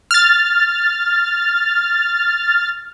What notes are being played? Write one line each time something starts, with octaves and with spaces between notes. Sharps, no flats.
F6 A6